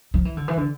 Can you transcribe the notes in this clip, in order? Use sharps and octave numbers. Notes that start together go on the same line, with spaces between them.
F3
E3
D3
E3
D3